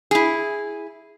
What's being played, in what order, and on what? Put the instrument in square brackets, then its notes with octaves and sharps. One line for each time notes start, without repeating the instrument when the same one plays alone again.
[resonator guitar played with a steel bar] E4 G#4